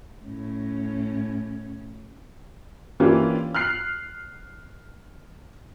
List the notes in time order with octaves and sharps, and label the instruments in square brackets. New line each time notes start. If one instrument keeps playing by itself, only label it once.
[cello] A2 C#4
[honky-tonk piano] E3 A#3 C#4 D4 F4 G4
F6 F#6 C7